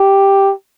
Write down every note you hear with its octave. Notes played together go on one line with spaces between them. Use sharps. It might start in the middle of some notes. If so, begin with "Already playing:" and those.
Already playing: G4